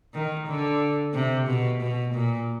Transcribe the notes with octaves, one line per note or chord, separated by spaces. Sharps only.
D#3
D3
C3
B2
B2
A#2